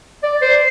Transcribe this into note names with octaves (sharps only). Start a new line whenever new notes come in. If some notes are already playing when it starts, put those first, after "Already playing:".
D5
C5